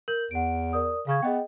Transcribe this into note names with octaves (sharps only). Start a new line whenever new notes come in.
A#4 G6 F#7
E2 F#5 D7
A#4 D5 D#6
C#3 F5 C#6 G#6
B3 G#4 D#5 G5